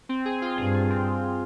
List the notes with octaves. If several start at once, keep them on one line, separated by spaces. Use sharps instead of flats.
C4
G#4
F4
G2 G#4
G#4
C4